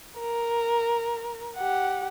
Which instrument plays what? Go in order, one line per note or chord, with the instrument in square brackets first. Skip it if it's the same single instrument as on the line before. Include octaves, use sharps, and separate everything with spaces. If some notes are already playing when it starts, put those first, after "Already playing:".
[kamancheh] A#4
G4 F#5